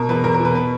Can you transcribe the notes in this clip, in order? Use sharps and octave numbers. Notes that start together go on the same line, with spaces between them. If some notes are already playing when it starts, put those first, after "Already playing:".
Already playing: B2 A#4
E2 B4
E2 A#4
A#4
B2
B4
B4